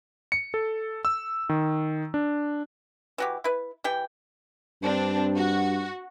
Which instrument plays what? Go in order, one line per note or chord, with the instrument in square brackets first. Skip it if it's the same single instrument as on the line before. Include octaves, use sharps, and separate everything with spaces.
[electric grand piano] C#7
A4
E6
D#3
D4
[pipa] E3 F#4 G4
E4 B4
E3 G4 G5
[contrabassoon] G2 [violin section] C4 D4
[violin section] F#4